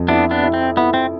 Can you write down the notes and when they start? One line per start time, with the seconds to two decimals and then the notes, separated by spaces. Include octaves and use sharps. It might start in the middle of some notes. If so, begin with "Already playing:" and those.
Already playing: F2
0.08 B3 D4 E4
0.31 B3 D4
0.43 E4
0.54 C4
0.77 B3 E4
0.94 C4